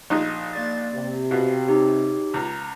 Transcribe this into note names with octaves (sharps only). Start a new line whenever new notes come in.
A#1 D#4 D#5
A#3 D5 A6
C3
B2 F5
D#4 G4 C#5
C#2 A#5